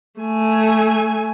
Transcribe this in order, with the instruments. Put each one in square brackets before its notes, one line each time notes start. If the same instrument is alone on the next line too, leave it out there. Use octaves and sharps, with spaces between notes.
[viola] A3 G#5